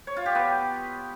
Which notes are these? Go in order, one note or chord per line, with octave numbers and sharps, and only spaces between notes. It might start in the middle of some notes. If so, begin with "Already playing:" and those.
C#5
F4
G4
B3